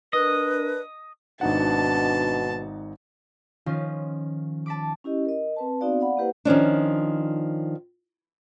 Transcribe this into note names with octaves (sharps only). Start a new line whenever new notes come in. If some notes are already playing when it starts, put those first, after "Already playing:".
D4 A#4 B4 D#5
G#1 B2 D4 D#4 F#5 A5
D#3 F3 C#4 F4
A5 B5 D6
C#4 E4 G4 D#5
A#4 D#5
C4 B4 A5
B3 C4 D#4 F#4 D5 F5
D5 F5 F#5 B5
A#3 E4 G4 B4 C5 F#5
D#3 F3 C#4 D4